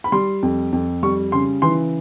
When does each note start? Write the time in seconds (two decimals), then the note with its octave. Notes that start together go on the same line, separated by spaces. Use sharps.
0.04 B5
0.12 G3 C6
0.43 F2
0.73 F2
1.03 G3 C#6
1.32 C#3 C6
1.62 E3 C6